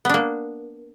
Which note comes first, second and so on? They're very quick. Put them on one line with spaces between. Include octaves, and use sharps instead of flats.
B3 D4 A#3